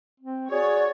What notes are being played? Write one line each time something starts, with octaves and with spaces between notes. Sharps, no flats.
C4
F#4 G#4 C#5 D5